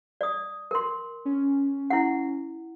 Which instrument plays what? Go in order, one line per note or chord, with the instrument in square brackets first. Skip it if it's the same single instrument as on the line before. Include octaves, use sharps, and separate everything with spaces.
[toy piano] D5 D#6
A#4 C6
[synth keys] C#4
[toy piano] E4 F#5